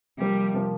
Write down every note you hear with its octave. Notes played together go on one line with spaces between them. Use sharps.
C3 F3 G3 A#3
C3 F3 A#3